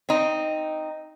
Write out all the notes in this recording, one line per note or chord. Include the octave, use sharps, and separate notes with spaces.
C4 D#4